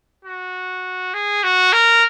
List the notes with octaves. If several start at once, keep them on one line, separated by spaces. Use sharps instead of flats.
F#4
G#4
F#4
A#4